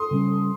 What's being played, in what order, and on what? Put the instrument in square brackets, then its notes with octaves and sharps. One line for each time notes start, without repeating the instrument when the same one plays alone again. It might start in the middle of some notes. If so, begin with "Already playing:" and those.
Already playing: [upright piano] C6 D#6
[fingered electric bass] C#3 G3 C#4